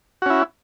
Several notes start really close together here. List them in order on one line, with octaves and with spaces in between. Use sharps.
F#4 C#4 E4